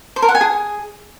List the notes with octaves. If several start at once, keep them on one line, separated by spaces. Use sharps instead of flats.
C5
A#4
F#5
G#5
G#4